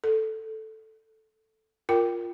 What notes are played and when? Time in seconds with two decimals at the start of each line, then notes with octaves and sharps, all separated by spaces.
0.04 A4
1.89 F4 A#4 G5